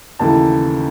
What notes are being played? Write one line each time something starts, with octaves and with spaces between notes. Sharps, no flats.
D#2 C#3 E3 A3 A5